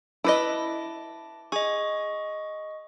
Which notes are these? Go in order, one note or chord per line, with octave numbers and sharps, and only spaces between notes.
E4 B4 D#5 A5 D6 A#6
G#4 D#5 C#6